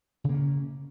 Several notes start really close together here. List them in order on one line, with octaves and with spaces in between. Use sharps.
C#3 A#3 C#4